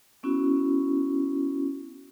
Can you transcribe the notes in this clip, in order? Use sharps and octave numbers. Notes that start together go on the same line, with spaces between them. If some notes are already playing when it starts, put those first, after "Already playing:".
B3 C#4 E4 F#4